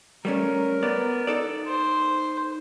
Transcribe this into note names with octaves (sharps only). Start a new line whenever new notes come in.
G3 A3 C#4 A#4
B3 D5
D#4 A4 D5
C5